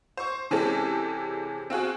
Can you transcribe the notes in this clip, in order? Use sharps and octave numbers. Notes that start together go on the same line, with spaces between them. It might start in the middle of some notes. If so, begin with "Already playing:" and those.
C5 C#6
C3 E3 G#3 C4 C#4 A4
C4 F4 F#4 G#4